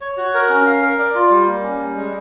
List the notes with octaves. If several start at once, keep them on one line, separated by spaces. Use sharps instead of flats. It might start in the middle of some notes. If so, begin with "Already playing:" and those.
C#5
F#4
A#4
C#4
F5
A#4
D5
F4
G3
A#3
C#4
G3
G#3